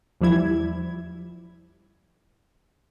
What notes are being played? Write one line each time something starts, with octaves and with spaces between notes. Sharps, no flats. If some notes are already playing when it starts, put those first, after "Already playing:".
E2 F3 G3 E4 G#6